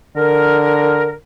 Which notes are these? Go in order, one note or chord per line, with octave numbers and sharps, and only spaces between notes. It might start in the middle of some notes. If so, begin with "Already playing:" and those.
D3 A#4